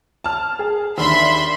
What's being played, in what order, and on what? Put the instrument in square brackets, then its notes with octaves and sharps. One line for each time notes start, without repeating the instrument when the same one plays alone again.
[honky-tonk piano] A5 F6
G#4
[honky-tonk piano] D#2 D4 B6 [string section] E5 B5 C6